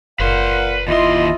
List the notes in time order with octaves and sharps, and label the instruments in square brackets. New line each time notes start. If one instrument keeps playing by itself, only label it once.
[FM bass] F#1 [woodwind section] A#2 F5 F#5 [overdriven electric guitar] B4 C6
[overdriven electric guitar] D#2 C6 [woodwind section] E4 F4 D#5